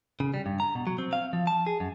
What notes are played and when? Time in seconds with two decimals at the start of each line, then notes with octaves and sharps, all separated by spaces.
0.20 C#3
0.34 G3
0.46 G2
0.60 A#5
0.75 B2
0.87 F#3
0.98 C4
1.13 F5
1.33 F3
1.47 A5
1.67 G#4
1.80 F#2